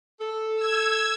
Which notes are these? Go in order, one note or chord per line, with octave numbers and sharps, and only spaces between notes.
A4
E6 G#6